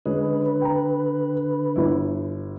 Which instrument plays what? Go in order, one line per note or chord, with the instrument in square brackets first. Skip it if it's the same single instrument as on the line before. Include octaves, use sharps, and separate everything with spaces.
[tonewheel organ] D3 B4 [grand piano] G#3 C#4 G#4
[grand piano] G5 A#5
G1 E4